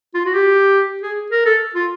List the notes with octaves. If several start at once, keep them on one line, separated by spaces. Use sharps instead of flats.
F4
F#4
G4
G#4
A#4
A4
F4